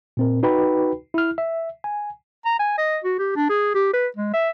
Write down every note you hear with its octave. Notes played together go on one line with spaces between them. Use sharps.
A#2 C4 A#4
D#4 F#4 B4 G5 B5
E4 F6
E5
G#5
A#5
G#5
D#5
F#4
G4
D4
G#4
G4
B4
G#3
E5